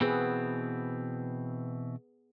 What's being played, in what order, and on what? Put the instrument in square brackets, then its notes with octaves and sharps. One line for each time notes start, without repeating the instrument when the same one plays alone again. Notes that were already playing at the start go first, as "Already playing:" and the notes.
[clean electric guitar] B2 E3 C4 [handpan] B3 G#4 B4